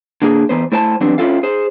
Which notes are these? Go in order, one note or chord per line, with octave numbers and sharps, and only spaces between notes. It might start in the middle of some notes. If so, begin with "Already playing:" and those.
D3 A#3 G#4
E3 B3 C5
A3 E4 C5 G#5 A5
E3 F#3 G3 B3 C4 D4
C#4 D4 E4 F4 A4 F5
G#4 C5